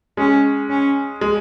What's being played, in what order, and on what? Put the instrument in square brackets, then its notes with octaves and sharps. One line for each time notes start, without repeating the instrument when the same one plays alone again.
[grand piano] G#3 [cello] C#4
[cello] C#4
[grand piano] G#3